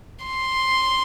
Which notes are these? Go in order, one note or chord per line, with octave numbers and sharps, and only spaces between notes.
C6